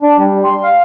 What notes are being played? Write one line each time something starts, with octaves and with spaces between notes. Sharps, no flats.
D4
G3
C6
F5